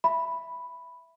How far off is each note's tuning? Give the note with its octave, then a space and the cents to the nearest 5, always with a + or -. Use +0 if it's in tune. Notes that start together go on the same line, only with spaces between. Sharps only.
E5 +5 B5 +0